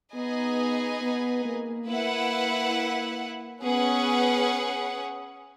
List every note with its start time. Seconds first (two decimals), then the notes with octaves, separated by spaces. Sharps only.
0.14 B3 D#4 G#4 B4 D#5 G#5
1.01 B3
1.45 A#3
1.89 A#3 E4 B4 F#5
3.63 B3 C#4 G#4 B4 F#5